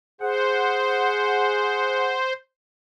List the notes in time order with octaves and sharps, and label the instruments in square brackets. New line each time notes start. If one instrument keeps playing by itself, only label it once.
[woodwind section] G#4 F#5 [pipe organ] C5